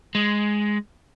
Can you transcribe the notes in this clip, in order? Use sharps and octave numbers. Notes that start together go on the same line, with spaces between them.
G#3